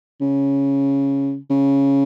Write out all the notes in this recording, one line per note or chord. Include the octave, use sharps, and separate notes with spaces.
C#3
C#3